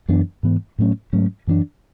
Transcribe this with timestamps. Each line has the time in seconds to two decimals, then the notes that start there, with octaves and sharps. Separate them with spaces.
0.08 F#2 E3 B3 D4
0.43 G#2 E3 B3
0.78 A2 F#3 A3 C#4
1.13 G#2 F#3 A3 C#4
1.47 F#2 E3 B3 D4